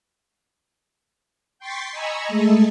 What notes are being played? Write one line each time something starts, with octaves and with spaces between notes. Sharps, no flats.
G5 C6 C#6 A6 B6 C7
D#5 G#5 A#5 B5 C#6 E6
G#3 A3 G#4 A4